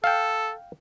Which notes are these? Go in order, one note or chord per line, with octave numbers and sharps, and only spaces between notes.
A4 F5 G5